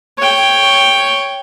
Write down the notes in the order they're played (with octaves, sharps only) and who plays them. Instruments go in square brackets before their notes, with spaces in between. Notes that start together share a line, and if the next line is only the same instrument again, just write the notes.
[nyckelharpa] C#5 G5